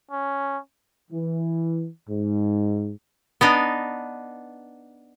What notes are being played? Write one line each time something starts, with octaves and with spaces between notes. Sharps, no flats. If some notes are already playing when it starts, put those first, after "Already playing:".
C#4
E3
G#2
B3 D4 D#4